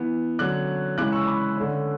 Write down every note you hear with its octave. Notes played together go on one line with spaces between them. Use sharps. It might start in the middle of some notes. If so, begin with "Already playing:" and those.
Already playing: E3 B3
D3 F#3 C#4 D6 F#6
C#3 E3 G#3 C#4 D6 F#6
C#6 E6
B5 D6
D3 A3 C#4